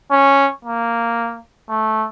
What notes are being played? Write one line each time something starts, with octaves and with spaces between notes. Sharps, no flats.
C#4
A#3
A3